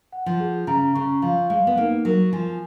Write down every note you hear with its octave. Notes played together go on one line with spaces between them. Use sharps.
F#5
F3
G#4
C#3 A#5
C#3 C#6
F3 F5
G#3 F5
B3
A#3 D#4
F#3 A#4
F3 G#5